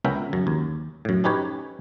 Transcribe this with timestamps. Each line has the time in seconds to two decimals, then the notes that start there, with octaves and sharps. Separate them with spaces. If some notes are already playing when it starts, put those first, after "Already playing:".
0.04 C#2 B3 C#4 A#4 E5 G5
0.33 F#2
0.47 D#2
1.05 F#2 A2
1.24 C#4 D#4 G4 B4 C#5